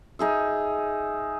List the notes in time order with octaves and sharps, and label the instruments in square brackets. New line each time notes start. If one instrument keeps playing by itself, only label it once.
[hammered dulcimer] D#4 G#4 E5